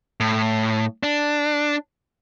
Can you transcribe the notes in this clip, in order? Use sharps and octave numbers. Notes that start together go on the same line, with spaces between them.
A2
D4